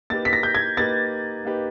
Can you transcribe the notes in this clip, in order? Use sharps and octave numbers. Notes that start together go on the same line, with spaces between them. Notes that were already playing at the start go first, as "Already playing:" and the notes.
A#3 D#4 G4 B4 A6
B6
A#6
G6
G#6
A#3 D#4 G4 B4 A6
A#3 D#4 G4 B4